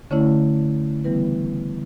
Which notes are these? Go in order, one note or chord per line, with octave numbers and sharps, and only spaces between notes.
D3 A3 C#4 E4 C#5
C#3 E3 G3 B3 E4 B4